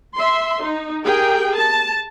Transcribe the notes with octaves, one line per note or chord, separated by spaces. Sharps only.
E5 C6
D#4
G4 G#4 A#4 G5
A5